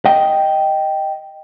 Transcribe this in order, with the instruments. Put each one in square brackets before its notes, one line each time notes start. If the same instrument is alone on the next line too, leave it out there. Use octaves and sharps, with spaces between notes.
[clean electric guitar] D#5 G5